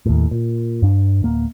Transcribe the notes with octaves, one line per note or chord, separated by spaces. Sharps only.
D#2 A2
A#2
G2 D4
D1 A#3